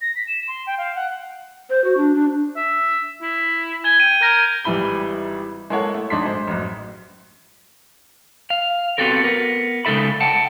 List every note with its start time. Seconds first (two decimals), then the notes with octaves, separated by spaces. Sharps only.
0.01 A#6
0.15 B6
0.27 E7
0.48 C6
0.66 G5
0.78 F5
0.95 F#5
1.70 C5
1.84 F#4
1.97 D4
2.15 D4
2.56 E5
3.22 E4
3.84 G#5 G#6 G7
4.00 G5 D#7
4.22 A#4 G6 A#6
4.64 G#1 E3 G3 E4 B5 G7
5.70 G#3 A#3 E4 A4 C#5 F#5
5.94 A3
6.10 G#1 D4 D#4 C6 B6 C7
6.26 G#3 C5
6.47 A1 F#2
8.50 F5
8.98 B3 C4 F#4 G4 A4 A#4
9.24 B3 A#4
9.85 C#3 G#3 D#4 A4 E5 B5
10.21 F#5 G5 A5